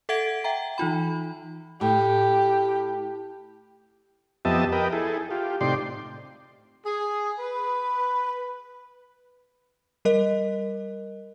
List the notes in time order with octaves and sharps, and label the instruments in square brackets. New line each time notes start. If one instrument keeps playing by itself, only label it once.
[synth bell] A4 E5 F#5 G#6 D7
E5 G5 A#5
E3 D#4 F4 B5
[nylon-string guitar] A2 [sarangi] G4
[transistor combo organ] F2 B3 G4 D#5 E5 A5
A#4 B4 D#5 G5
E4 G#4 A4
F4 G4
A2 C3 D#4 D5 G5 C6
[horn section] G#4
B4
[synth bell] G3 A#4 D#5